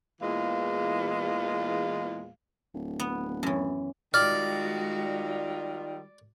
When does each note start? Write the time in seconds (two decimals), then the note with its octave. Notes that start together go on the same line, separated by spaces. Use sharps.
0.21 E2 A#2 E3 G#3 F5
2.74 D1
3.00 B3
3.43 F#2 E3
4.14 D#3 G3 G#3 F4 F#4 D5 F6